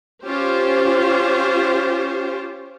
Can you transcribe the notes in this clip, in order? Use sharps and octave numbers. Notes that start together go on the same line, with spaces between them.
C#4 F4 G4 C5